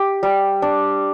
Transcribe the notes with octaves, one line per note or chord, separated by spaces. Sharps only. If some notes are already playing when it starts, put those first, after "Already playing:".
Already playing: G4
G3
D4